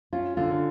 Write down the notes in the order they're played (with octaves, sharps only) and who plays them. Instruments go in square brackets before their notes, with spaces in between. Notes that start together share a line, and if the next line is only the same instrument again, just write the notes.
[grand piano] C#4 [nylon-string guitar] F4
[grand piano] D3 [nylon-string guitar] F4
[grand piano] D3